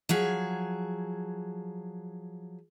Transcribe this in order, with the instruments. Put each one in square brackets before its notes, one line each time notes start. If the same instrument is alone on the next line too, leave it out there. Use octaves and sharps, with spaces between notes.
[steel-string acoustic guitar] F3 F#3 G#4